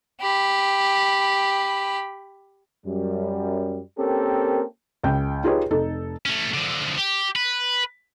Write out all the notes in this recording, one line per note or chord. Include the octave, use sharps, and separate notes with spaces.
G4 B5
F#2 G3
A#3 C4 C#4 G4 A4 A#4
C#2 G5 G6
D#4 F4 G4 G#4 B4 C#5
F1 D#4 A4
A3 C#4
D3 F3
G4
B4